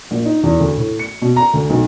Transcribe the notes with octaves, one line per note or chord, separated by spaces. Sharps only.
A#1
D#4
E2
D2
A2
C#7
B2
A#5
D2
B1